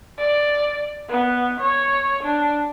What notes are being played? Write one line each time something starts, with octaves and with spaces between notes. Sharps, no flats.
D5
B3
C#5
D4